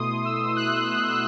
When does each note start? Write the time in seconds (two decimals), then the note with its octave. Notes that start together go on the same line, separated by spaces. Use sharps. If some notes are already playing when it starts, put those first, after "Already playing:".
Already playing: B2 A3 E4 C6 D#6
0.25 E6
0.56 F#6